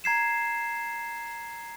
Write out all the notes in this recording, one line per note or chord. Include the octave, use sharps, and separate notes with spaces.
A#5 G#6 C7 E7